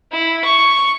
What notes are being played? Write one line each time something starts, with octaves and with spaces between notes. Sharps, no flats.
E4
C#6